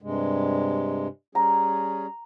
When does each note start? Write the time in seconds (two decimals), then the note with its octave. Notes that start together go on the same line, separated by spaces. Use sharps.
0.02 G2 C3 G#3
1.35 G3 C#4 G#4 A#5